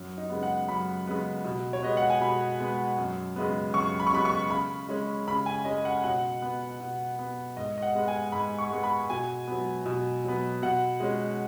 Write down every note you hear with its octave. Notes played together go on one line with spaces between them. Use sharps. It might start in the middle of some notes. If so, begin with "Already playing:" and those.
Already playing: F#2
D#4
C#3 G#3 B3
F#5
F#2 B5
C#3 G#3 B3
B2
C#5
G#3 B3 D#5
F#5
G#5
B2 B5
G#3 B3
F#2
C#3 G#3 B3
F#2 C#6
B5
C#6
C#3 G#3 B3 B5
C#6
C#3 B5
G#3 C#4
C#3 B5
G#5
G#3 C#4 D#5
F#5
B2 F#5
B3
B2
B3
G#2 D#5
D#5
F#5
G#3 B3
G#5
G#2 B5
C#6
G#3 B3
B5
B2 G#5
F#3 B3
B2
F#3 B3
B2 F#5
G#3 C#4